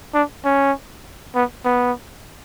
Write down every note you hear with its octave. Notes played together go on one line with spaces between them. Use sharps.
D4
C#4
B3
B3